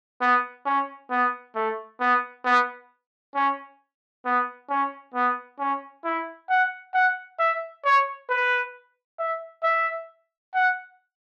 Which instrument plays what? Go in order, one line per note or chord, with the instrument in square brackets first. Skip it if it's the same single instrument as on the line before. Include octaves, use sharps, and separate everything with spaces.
[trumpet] B3
C#4
B3
A3
B3
B3
C#4
B3
C#4
B3
C#4
E4
F#5
F#5
E5
C#5
B4
E5
E5
F#5